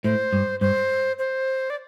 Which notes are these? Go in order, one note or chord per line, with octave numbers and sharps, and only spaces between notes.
A2 C5
G2
G2 C5
C5
D5